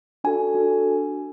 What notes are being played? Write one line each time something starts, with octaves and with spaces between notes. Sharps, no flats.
D4 F#4 A4 G#5
D4 F#4 A4